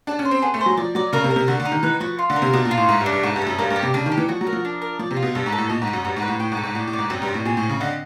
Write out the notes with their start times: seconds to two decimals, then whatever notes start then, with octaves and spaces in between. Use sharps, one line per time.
0.07 D4 A5
0.19 C#4
0.25 C5
0.31 C4
0.42 B3 G#4
0.54 A3
0.61 C5
0.66 F#3
0.77 F3 D5
0.95 F#3 D5
1.13 C#3 A#4
1.24 C3
1.31 A#4
1.36 C3
1.48 D3 F#4
1.60 D3
1.65 D#4
1.72 D#3
1.83 E3 B4
2.00 F3 F#4
2.19 F4
2.30 D3
2.36 A#4
2.42 C3
2.53 B2 D4
2.65 A#2
2.71 F4
2.77 A2
2.89 G#2 A3
3.01 G2
3.06 D4
3.12 G2
3.23 G#2 A3
3.36 G2
3.42 A3
3.47 F#2
3.58 G2 A#3
3.70 G2
3.76 G4
3.83 C3
3.94 C#3 D4
4.06 D#3
4.12 G4
4.18 E3
4.29 F3 F#4
4.41 F#3
4.47 A#4
4.53 F3
4.65 D4
4.82 A#4
4.99 F3 D5
5.11 C3
5.17 F4
5.22 B2
5.35 G2 A4
5.46 G#2
5.52 A4
5.58 A2
5.69 A#2 D#5
5.82 G#2
5.87 F#4
5.93 F#2
6.05 G2 F#4
6.17 G#2
6.22 B4
6.28 A2
6.40 A2 G5
6.52 G#2
6.57 A4
6.64 G#2
6.75 A2 D5
6.87 A2
6.93 D5
6.99 G#2
7.10 F#2 C4
7.22 G2
7.28 C4
7.34 A2
7.45 A#2 G#4
7.57 A2
7.63 C4
7.69 C#3
7.80 D3 D#5